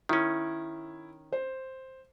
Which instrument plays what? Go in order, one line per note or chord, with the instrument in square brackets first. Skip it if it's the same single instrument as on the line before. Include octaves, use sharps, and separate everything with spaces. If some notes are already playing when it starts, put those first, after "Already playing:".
[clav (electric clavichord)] D#3 C#4 [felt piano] E4
[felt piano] C5